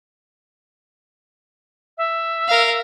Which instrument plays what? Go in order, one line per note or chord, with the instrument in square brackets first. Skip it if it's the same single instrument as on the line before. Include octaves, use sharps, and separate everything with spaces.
[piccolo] E5
[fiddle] A#4 F5